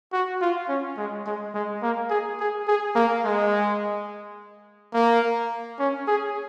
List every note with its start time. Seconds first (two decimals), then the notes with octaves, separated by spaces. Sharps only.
0.13 F#4
0.41 F4
0.68 C#4
0.97 G#3
1.26 G#3
1.54 G#3
1.82 A#3
2.10 G#4
2.40 G#4
2.68 G#4
2.95 A#3
3.24 G#3
4.94 A#3
5.79 C#4
6.07 G#4